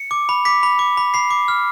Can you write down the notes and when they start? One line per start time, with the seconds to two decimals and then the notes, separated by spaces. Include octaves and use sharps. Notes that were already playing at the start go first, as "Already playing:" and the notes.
Already playing: C#7
0.11 D6
0.29 B5
0.45 D6 B6
0.63 B5
0.79 D6
0.97 B5
1.14 B5 C7
1.30 D6
1.48 F6